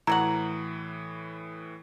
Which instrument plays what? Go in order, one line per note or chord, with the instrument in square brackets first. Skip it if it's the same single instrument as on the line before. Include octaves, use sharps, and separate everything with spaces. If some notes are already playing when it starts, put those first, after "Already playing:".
[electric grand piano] A2 E3 [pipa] E4 F#4 F#5 [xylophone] A#5